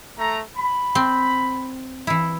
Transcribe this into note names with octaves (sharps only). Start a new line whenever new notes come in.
A3 A#5
B5
C4
E3 E4